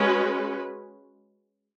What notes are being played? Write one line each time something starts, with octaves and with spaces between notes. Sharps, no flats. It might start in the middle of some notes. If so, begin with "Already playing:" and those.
Already playing: G#3 C#4 F#4 B4